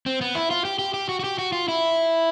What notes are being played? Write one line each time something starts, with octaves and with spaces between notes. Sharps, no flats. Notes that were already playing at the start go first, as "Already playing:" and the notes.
C4
B3
E4
F4
G4
G4
G4
F#4
F#4
G4
F#4
F4
E4